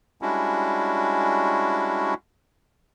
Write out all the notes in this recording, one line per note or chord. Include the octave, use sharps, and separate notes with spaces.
G3 G#3 C#4 D4 E4 F#4